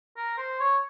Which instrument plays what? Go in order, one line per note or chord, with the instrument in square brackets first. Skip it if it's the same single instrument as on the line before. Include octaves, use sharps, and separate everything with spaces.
[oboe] A#4
C5
C#5